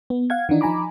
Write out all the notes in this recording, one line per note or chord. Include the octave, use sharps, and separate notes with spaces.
B3
F5 F#5 G#6
D#3 E3 D4 D#4
F3 D#4 G#5 A#5 B5 D6